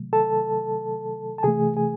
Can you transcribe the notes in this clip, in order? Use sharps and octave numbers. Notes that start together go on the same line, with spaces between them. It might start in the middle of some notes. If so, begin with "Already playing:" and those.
Already playing: C3 D#3 F#3 A3
A4 A5
A5
C3 E3 A3 G#4 G#5
G#4 G#5